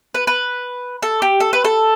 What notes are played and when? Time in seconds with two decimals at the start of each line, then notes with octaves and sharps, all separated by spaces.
0.14 B4
0.27 B4
1.02 A4
1.22 G4
1.40 A4
1.53 B4
1.65 A4